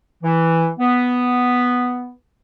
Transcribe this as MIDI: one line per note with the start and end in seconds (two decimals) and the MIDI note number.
0.22 0.68 52
0.79 2.10 59